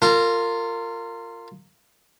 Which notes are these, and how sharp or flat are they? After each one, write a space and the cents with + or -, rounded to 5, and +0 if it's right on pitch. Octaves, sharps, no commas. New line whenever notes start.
F4 +0 A#4 -30